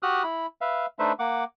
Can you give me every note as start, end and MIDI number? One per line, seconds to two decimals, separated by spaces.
0.03 0.23 66
0.03 0.23 67
0.03 0.23 87
0.03 0.23 89
0.03 0.23 90
0.24 0.46 64
0.24 0.46 83
0.61 0.86 71
0.61 0.86 76
0.61 0.86 77
0.99 1.12 57
0.99 1.12 62
0.99 1.12 63
0.99 1.12 71
0.99 1.12 72
0.99 1.12 76
1.19 1.44 58
1.19 1.44 78
1.19 1.44 86